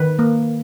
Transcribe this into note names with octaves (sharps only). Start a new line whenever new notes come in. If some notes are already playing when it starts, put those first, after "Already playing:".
Already playing: D#3 B4
A#3